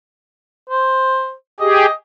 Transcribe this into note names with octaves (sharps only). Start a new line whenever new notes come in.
C5
G4 G#4 D#5